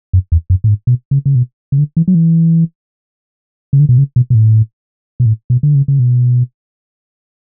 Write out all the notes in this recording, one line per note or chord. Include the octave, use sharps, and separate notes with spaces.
F#2
E2
F#2
A2
G#2
B2
C#3
C#3
B2
C#3
D3
E3
F#3
E3
C#3
D3
B2
C#3
B2
B2
A2
B2
A2
B2
D3
C#3
C#3
B2